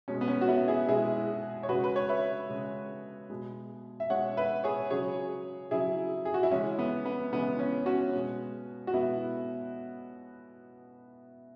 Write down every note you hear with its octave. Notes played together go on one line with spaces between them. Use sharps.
B2 G#3 C#4
B3
C#4
F#4
B3 E4
E4 G#4
B2 G#3 E4 G#4
C#5
C#3 G#3 F#4 B4
B4
C#5
B4 E5
C#3 G#3
B2 G#3
E5
B2 G#3 C#5 F#5
B4 E5
G#4 C#5
C#3 F#3 G#4 C#5
C#3 F#3 E4 G#4
G#4
F#4
E4
C#3 E3 G#3 C#4
B3
B3
C#3 E3 G#3 B3
C#4
C#4 F#4
B2 G#3
F#4
B2 G#3 B3 E4